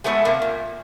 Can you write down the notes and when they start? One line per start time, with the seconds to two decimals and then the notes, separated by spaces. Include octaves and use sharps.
0.04 G#3 A3 B3 C#5 E5
0.25 C3 A3 A#3
0.42 A#2